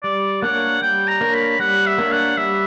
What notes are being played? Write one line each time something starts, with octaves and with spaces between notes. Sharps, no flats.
G3 D5
A#3 D4 A#4 C#5 F#5
G3 G5
A#5
A#3 D4 A#4 C#5
B5
G3 F#5
E5
A#3 D4 A#4 C#5
F#5
G3 E5